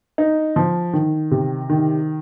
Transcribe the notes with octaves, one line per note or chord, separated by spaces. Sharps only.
D#4
F3
D#3
C3
D#3